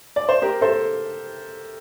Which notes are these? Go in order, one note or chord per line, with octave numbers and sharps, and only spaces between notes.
D5
C5
G4 A#4
A4 C5